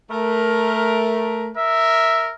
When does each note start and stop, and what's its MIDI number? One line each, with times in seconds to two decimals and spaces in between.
0.11 1.50 57
0.11 1.50 70
1.57 2.35 70
1.57 2.35 76